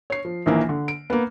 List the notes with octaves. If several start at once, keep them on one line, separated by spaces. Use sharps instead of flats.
C#5 C7
F3
A#1 D#3 E3 A#3
D3
D7
A#3 B3